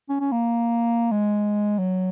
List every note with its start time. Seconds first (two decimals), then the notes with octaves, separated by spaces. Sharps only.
0.10 C#4
0.21 C#4
0.32 A#3
1.11 G#3
1.79 F#3